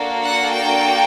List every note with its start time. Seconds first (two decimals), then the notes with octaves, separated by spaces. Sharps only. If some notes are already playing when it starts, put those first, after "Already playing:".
Already playing: A#3 D4 F#4 A4
0.24 F#5
0.54 G5